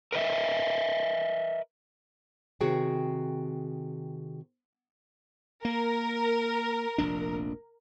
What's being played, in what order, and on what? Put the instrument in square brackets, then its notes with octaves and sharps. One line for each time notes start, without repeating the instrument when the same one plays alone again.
[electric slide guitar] A#4 B4 D#5 E5
[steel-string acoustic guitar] C3 D#3 F#4 G#4 G5
[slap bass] A#3 [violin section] A#4
[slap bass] F1 A#1 D4